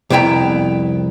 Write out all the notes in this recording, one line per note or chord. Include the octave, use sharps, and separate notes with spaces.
C2 F2 B3 E4 G5 A#5